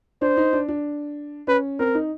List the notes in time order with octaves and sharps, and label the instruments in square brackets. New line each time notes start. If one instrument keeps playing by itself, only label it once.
[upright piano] D4 [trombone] C5
[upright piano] D#4
D4
D4
[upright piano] C#4 [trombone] B4
[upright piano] C4 [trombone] A#4
[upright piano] D#4